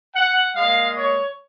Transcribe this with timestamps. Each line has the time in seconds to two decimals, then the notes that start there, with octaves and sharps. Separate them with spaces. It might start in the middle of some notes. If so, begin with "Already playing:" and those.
0.16 F#5
0.56 A#2 G#3 F5
0.96 C#5